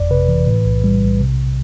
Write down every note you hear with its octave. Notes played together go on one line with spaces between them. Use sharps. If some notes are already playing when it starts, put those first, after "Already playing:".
Already playing: G1 F2 D5
C3 B4
E3
A2
B1
G3
B1
C3